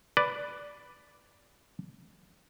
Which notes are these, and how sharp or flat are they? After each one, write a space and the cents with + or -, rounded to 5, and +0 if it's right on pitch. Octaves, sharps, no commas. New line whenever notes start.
B4 +5 D5 +0